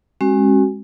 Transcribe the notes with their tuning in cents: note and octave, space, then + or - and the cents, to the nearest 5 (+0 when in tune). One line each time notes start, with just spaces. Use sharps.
G#3 -15 C#4 -40 F#4 +20